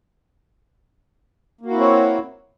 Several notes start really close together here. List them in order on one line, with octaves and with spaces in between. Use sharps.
A#3 F#4 E4 C4 C#5